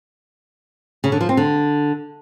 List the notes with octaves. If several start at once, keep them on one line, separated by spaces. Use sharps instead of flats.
C#3
D3
F3
C4
D3